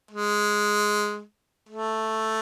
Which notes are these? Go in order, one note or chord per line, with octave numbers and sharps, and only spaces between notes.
G#3
A3